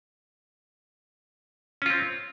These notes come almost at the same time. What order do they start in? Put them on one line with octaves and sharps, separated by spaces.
C#4 F4 C4